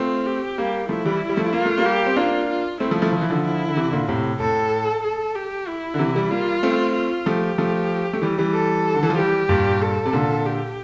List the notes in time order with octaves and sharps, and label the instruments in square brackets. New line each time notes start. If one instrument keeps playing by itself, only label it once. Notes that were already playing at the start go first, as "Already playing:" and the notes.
Already playing: [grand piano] A3 C4 [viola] F4
[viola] G4
[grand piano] G3 A#3
[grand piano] F3 A3 [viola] E4
[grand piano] E3 G3
G3
F3 A3
[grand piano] A#3 [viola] F4
[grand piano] A3
G3 A#3
[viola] G4
[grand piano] C4
[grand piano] A#3 D4 [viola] F4
[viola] F4
[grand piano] A3 C4 [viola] E4
[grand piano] F3 A3
F3 A3
F3
E3
D3 F3
[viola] E4
[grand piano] D3
C3 E3
A#2 D3
A2 C3
[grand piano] A2 [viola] A4
[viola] A4
G4
E4
[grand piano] D3
C3 E3
E3 G3
[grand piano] G3 A#3 [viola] F4
[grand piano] A3 C4
[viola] F4
[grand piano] F3 A3 [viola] G4
[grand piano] F3 A3
A3
E3 G3
E3 G3
[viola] A4
[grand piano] D3
E3
F3
[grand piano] E3 G3 [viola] G4
[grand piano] G2 A#2
[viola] A4
[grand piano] C3
A#2 D3
[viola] G4